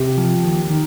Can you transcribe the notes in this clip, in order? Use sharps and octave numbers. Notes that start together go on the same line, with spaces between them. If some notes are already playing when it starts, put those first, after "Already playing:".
Already playing: C3 G4
F3
D#2
D#3